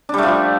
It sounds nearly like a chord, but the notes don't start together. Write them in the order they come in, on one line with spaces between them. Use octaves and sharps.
D4 G3 A3 F3